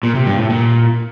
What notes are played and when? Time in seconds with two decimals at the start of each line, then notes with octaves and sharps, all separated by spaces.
0.03 A#2
0.15 C3
0.27 G2
0.38 A2
0.50 A#2